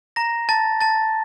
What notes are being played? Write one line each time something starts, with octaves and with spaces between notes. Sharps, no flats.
A#5 A#6
A5 A6
A5 A6